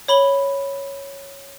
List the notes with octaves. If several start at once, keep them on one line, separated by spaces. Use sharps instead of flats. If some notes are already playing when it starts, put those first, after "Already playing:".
C#5 B5 F#7 G7